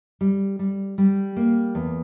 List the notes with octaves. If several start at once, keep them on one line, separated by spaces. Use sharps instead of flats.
G3
G3
G3
A#3
E2